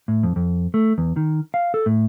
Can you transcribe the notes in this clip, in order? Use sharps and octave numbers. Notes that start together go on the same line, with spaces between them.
A2
F2
F2
A3
E2
D#3
F5
A4
A2